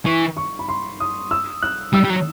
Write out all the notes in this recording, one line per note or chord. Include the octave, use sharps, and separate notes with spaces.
E3 C#6
C#6
B5
C6
D#6
E6
F#6
G3 E6
G3
F#3